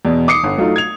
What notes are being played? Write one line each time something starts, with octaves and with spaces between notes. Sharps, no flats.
E2 B2
D6 D#6 C7 C#7
G1
F#3 A3 D#4 F4
G#6 F7